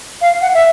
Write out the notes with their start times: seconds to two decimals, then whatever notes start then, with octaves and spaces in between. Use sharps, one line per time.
0.21 F5
0.41 F#5
0.54 E5